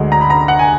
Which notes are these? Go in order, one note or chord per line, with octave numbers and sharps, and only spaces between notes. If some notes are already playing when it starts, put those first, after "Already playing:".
Already playing: D2 D3 G#3
A#5
B5
A#5
F#5
G#5